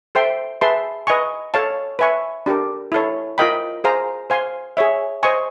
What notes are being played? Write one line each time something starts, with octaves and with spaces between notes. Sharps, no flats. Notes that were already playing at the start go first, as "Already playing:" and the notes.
A4 C5 E5 G5 C6
G#4 B4 E5 A5 C6
B4 D#5 G#5 C#6
A4 C#5 F5 A5
B4 E5 G#5 C#6
D4 G4 A#4
E4 A4 C#5
F4 A#4 D#5 G5 B5
G#4 C5 F5 A#5
C5 F5 G#5 C6
G#4 C#5 E5
C5 D#5 G#5 C#6